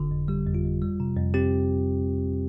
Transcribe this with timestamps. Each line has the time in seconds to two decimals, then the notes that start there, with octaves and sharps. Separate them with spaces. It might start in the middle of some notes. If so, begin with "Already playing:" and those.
Already playing: G1 D3
0.11 F2
0.28 G3 G4
0.47 F2
0.55 F4
0.65 F2
0.82 G3
1.00 C3
1.16 F2
1.34 C4 G4